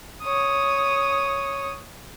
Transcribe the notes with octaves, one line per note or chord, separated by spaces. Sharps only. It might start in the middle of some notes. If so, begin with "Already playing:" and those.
C#5 D#6